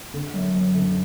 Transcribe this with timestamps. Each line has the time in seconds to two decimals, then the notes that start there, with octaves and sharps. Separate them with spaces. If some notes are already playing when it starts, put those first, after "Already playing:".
0.14 D3
0.34 F#2
0.55 F#2
0.75 D3